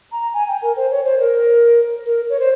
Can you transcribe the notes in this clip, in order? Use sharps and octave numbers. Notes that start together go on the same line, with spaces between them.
A#5
G#5
G5
A#4
C5
C#5
C5
A#4
A#4
C#5
C5